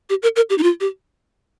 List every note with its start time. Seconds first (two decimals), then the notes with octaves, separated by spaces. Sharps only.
0.10 G4
0.23 A#4
0.36 A#4
0.50 G4
0.58 D#4
0.63 F4
0.80 G4